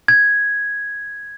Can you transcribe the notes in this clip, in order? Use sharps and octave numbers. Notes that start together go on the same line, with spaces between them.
G#6